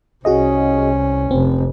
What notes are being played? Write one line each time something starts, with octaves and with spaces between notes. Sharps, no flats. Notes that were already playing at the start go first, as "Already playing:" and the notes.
C2 C#4 F#4 G#4 D#5
F1 C4